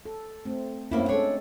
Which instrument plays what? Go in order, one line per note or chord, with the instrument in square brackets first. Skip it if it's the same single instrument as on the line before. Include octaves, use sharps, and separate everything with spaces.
[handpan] A4
A3 C4
[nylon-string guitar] G2 A#3 E4 [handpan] C4 C#4 F#4
[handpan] G#3 A3 A4 [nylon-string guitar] D4 C#5